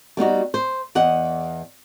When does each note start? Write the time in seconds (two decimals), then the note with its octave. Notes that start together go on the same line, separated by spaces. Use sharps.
0.17 G3 B3 D#4 F#4
0.54 C5
0.95 E2 D#5 F#5